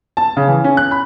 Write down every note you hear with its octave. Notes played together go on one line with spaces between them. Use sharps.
A5
C#3
E3
C#4
F#6
B5